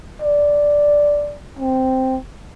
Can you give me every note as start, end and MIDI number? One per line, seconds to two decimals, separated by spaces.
0.22 1.36 74
1.59 2.18 60